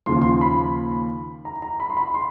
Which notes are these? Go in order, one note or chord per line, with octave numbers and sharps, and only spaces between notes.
D#2 C#3 F3 C6
C6
B5
A#5
A#5
B5
C6
B5
C6